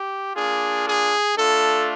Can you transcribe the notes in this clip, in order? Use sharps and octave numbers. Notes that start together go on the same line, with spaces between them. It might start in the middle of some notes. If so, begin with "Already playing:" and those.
Already playing: G4
A#3 D4 F4 G#4
G#4
A3 D4 F4 A4